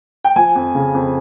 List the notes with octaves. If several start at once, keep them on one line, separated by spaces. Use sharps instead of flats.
G5
F3 G#5
F2
C#3
F2